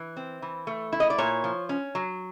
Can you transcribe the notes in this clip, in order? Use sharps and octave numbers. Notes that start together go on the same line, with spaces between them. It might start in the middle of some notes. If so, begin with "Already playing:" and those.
Already playing: E3
C4
E3
A3
E4
D#5
D5
A#2 C#5
F3
C#4
F#3